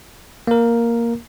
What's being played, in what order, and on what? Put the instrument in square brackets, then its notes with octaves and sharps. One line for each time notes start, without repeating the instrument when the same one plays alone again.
[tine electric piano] A#3 A#4